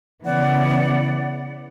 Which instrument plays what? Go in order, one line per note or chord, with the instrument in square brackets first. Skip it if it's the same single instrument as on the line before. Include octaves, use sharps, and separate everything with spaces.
[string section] C#3 E3 B3 [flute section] D5 F#5